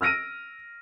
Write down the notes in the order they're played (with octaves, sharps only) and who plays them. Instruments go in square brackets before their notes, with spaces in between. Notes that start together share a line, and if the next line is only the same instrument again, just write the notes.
[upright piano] E6 F6 A#6 D7 D#7